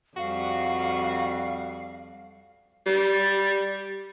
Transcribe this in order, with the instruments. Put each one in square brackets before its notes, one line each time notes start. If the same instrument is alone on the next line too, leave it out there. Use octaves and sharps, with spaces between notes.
[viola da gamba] F2 G3 [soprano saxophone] F#4 [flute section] F5
[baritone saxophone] G3